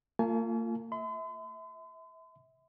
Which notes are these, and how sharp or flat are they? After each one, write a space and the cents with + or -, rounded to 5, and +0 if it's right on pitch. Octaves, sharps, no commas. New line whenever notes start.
A#3 -40 F4 +0 G#5 +40
E5 -30 C6 -45